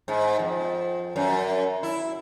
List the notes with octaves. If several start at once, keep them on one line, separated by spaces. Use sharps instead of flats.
G#2
F2
F#2
E4